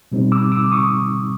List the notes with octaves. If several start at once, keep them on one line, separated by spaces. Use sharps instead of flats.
B2 G3 C4 D#4
D6 E6
D6 E6
C#6 D#6